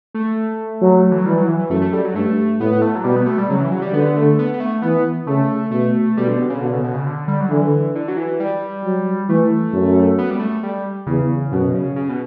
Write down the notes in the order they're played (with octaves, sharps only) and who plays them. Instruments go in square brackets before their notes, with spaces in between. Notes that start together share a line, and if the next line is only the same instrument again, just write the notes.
[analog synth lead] A3
[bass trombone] F#3
[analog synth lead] E3
F#3
[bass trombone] E3 [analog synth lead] G3
[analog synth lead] F#3
E3
E3
[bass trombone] F#2 [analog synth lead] A3
[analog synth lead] A3
G3
F#3
[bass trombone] G2 [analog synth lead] A3
[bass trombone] A2 [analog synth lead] B3
[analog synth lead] A3
F#3
[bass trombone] B2 [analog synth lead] G3
[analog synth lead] B3
A3
G3
[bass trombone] C#3 [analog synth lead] F#3
[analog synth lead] E3
F#3
G3
[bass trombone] D3 [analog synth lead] B3
[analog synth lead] A3
B3
B3
A3
[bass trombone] E3 [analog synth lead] B3
[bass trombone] C#3 [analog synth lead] A3
[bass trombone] B2 [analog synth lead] A3
[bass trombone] B2 [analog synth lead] G3
[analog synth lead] D3
B2
C#3
[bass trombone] B2 [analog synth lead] D3
[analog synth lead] C#3
B2
C#3
D3
G3
F#3
[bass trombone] D3 [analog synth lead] E3
[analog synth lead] D3
F#3
E3
G3
[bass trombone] F#3
[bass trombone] E3 [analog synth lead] A3
[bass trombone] F#2
[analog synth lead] B3
G3
A3
G3
[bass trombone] E2 [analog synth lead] C#3
[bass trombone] F#2 [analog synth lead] B2
[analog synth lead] C#3
C#3
B2